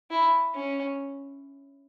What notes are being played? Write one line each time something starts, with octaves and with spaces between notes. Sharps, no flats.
E4
C#4